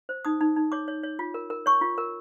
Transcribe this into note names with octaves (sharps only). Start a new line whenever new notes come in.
C5
D#4 D#6
D#4
D#4
C#5 D6
C#5
C#5
F4
A#4
A#4
C#5 C#6
F4
A#4